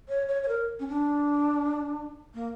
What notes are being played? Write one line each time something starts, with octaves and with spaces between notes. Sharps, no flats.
C#5
C#5
C#5
A#4
C#4
D4
A#3